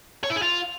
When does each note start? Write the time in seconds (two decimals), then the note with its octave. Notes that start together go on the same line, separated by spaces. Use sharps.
0.24 C#5
0.30 E4
0.36 G#4
0.42 F4